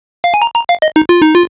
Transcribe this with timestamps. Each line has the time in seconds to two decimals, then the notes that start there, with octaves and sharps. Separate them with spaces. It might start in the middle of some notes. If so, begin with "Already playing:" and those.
0.24 F5
0.34 G#5
0.42 A#5
0.56 A#5
0.69 F5
0.82 D#5
0.96 D#4
1.09 F4
1.22 D#4
1.35 F4